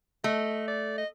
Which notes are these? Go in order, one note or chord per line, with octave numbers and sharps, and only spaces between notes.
A3 D#5
D5
D#5